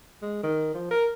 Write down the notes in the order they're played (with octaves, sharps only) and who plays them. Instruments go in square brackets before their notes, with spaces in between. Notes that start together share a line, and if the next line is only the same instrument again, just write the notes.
[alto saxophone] G#3
D#3
F3
A#4